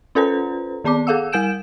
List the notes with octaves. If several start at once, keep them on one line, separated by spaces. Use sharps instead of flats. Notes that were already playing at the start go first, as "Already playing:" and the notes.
C#4 F4 A4 B4 C5 A#5
D#3 B3 D5 A5 D6
G#4 A4 F5 F#5 E6
G3 A#4 G#5 G6 D7 E7